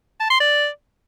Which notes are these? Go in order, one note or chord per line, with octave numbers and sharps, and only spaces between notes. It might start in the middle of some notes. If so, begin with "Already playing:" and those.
A5
C6
D5